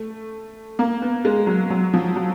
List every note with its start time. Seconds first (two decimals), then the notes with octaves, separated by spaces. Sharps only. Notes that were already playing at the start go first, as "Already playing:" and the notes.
Already playing: A3
0.79 A#3
1.02 B3
1.25 G#3
1.47 F#3
1.70 F#3
1.94 F3
2.16 F#3